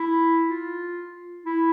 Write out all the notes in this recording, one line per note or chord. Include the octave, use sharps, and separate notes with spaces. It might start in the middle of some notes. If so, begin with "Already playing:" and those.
Already playing: E4
F4
E4